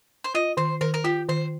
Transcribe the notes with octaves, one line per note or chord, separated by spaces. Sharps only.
C5
F4 D#5
D#3 C5
D#3 A#4
A#4
F4 G4
D#3 C5